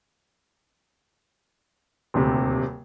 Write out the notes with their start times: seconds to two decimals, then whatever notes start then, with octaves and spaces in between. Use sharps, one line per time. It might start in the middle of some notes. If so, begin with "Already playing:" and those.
2.14 D#1 D2 C3